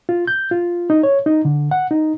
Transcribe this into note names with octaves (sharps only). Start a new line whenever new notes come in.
F4
G6
F4
D#4
C#5
D#4
D3
F#5
D#4